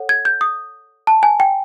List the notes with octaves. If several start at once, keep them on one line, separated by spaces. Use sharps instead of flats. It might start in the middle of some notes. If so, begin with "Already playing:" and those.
Already playing: A4 C#5 F#5
G#6
G6
D#6
A5
G#5
G5